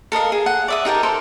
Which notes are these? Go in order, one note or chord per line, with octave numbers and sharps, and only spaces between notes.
A4 A#4 D#5 F5
G#4
F#5
D5 E5 D#6
D#4 G4 A#4 A5
A4 A#4 C5